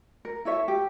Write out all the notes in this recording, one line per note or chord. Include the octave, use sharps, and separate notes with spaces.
A#4
E4 A4 C#5 E5
G4